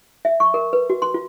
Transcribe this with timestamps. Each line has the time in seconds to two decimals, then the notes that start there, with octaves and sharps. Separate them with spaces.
0.25 E5
0.40 C#6
0.54 A#4
0.73 B4
0.90 F#4
1.02 C6
1.14 F4